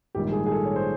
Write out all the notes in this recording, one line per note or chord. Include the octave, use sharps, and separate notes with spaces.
A#1 G#2 D#3 G3 G4
G#4
G#4
A4
C#5
C5